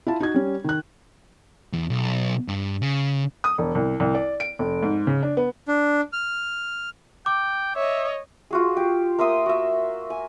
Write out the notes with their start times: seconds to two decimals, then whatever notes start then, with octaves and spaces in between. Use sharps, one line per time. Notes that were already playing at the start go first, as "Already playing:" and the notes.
0.07 E4 F4 A5
0.20 D#4 F#4 G#6
0.34 G3 C#4
0.64 D#3 F#6
1.73 E2
1.90 B1
2.48 G2
2.82 C#3
3.44 D#6
3.58 E1
3.75 C2
4.00 C2
4.14 D5
4.40 D7
4.59 F1
4.83 G#2
5.07 C#3
5.23 D4
5.37 B3
5.68 D4
6.13 F6
7.26 G5 D6
7.75 C#5 D#5 E5
8.51 F4 F#4 G#4
8.77 G4
9.18 A#3 E5 C6 D#6
9.46 F#4 E5
10.10 G#5